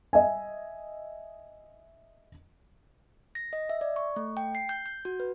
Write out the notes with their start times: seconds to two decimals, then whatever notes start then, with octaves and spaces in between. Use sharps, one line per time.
0.13 D#5 E5 G#5
3.35 A#6
3.53 D#5
3.69 E5
3.81 D5
3.96 C#6
4.16 A3
4.37 G5
4.55 C7
4.69 G6
4.86 G6
5.05 F#4
5.20 B4